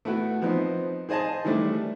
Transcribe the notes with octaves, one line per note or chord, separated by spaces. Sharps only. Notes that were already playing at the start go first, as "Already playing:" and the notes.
A3 B3 E4 F#4
F3 B3 C4 D#4
G#4 C5 D#5 G#5 A5
D#3 E3 G3 A3 D4